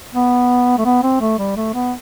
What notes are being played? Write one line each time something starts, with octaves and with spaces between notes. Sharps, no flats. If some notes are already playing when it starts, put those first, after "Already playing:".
B3
A3
B3
C4
A3
G3
A3
B3